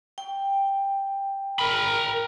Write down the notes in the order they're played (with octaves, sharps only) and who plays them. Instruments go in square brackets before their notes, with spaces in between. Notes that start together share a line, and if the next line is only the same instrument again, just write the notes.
[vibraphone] G5
[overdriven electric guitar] A#4 B5